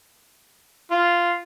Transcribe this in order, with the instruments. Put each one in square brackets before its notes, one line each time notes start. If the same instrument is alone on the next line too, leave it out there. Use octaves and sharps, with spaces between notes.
[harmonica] F4